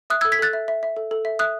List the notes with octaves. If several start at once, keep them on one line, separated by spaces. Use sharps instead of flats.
E5 D#6 F#6
A4 E6 G#6
G#6 B6
A4 F#6 A6
E5
E5
E5
A4
A4
E5
E5 D#6 F#6